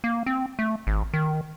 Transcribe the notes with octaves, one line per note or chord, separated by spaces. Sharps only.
A#3
C4
A3
G#1
D#3